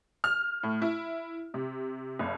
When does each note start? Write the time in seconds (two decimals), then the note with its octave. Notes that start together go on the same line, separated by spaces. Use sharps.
0.24 F6
0.63 A2
0.82 E4
1.54 C3
2.19 F#1